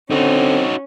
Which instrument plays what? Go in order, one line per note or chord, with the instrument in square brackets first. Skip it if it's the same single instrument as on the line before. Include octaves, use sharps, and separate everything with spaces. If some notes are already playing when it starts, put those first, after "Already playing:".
[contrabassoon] D3 [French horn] C4 [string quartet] C#4 [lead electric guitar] D#4 F#4